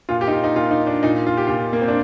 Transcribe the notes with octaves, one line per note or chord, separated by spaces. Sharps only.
A#2 F4
G4
D#4
F4
D#4
A#2 F4
D#4
D4
A#2 D#4
F4
G4
A#2 F4
A#3
C4
D4